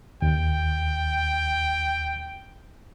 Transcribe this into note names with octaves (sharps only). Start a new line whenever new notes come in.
D#2 G5